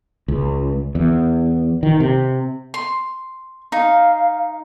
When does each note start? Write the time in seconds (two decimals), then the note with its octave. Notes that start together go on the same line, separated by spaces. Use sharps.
0.28 C#2
0.95 E2
1.83 D#3
2.00 C3
2.74 C6
3.72 D#4 F5